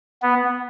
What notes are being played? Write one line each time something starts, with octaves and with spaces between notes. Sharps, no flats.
B3